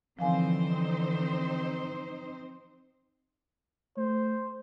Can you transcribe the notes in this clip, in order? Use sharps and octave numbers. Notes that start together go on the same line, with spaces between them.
D3 E3 F3 C4 D#4 C5 F5 G#5
A3 C5